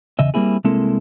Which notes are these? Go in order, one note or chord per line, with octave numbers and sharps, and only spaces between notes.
E2 C#3 D#5 E5
G3 A#3 C4 E4 G#4
C2 G#3 A#3 C4 E4 A4